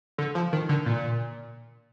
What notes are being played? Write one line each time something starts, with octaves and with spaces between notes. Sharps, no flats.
D3
F3
D#3
D3
A#2